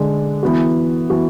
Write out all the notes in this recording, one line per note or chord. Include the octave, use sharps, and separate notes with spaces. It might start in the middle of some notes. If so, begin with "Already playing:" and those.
Already playing: D3 G#3 D4
E3 B3 F#4
E3 B3 F#4